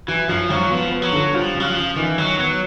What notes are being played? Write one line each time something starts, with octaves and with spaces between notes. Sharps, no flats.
E3 F#3
F#2 F3
G#1 F#3
F3 B3
B3
F#3
D3
F3 G3
C#3
F#3
F3
C#3
D#3 E3
D#3 F#3
F#3 B3